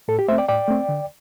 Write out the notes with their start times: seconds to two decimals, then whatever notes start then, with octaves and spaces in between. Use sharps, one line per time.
0.08 A2 A4
0.19 G4
0.28 A3 C5 E5
0.32 C4
0.38 D5 G5
0.48 A2 D5 G5
0.68 A3 C4
0.89 D3